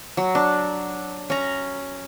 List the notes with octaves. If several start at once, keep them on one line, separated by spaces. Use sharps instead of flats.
F#3
D4
C#4 A#5